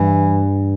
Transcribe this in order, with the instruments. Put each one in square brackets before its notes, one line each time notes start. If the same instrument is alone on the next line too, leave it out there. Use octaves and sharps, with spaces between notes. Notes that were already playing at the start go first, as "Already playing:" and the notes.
Already playing: [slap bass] G2 [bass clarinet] E3